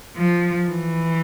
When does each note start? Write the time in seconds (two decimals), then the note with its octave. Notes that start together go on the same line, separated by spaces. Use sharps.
0.16 F3
0.70 E3